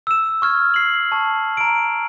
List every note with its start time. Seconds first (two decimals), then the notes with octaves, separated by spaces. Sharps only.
0.07 E6 E7
0.42 C#6 F6 G#6
0.74 C7 F#7
1.12 A5 C#6
1.57 A#5 D7